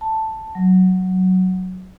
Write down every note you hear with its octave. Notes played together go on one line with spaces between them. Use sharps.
A5
F#3